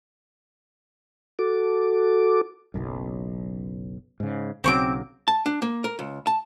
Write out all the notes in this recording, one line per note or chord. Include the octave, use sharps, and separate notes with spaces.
F#4 A4 D6
F#1 B1 F#2
G#2 C#3
B1 C#3 F#3 C4 C#6 D6
A5
D4
A#3
A#4
C#2
A5